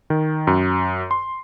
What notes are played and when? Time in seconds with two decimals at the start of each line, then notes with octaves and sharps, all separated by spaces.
0.10 D#3
0.47 F#2
1.11 C6